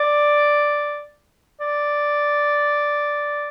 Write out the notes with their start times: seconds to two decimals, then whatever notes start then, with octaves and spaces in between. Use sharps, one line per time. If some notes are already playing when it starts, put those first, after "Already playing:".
Already playing: D5
1.61 D5